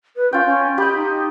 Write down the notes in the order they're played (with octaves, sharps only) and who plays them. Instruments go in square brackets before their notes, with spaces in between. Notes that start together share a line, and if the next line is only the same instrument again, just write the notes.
[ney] B4
[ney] C#4 [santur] F4 G5
[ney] C#4
[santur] G4 D#5 [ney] B5
[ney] D#4